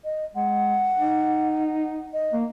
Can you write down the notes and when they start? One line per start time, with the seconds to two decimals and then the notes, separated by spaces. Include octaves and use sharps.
0.05 D#5
0.36 G#3 F#5
0.99 D#4
2.13 D#5
2.33 A#3